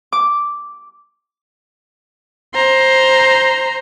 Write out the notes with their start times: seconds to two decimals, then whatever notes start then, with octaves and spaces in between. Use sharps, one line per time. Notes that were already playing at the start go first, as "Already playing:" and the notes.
0.12 D6
2.55 C5 A#5